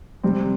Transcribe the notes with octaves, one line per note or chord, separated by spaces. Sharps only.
C3 G3 C4